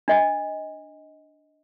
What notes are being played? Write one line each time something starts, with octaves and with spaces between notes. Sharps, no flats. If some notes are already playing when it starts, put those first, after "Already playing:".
D4 D#5